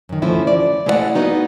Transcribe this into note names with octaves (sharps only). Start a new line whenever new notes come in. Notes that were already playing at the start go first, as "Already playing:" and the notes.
F#2 D#3
D3 E3 F3 A3 C#4 E4
D5
G#3 A3 E4 C#5 D5 F#5
A#3 B3 D#4 F#4